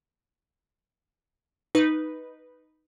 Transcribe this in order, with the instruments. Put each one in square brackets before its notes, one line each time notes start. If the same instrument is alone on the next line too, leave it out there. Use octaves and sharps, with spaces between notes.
[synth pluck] D#4 B4